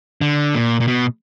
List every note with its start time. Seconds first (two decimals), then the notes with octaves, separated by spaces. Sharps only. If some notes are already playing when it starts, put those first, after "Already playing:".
0.21 D3
0.55 A#2
0.80 A#2
0.88 B2